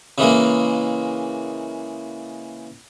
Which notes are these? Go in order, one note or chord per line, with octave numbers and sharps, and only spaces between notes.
C#3 E3 G#3 A#3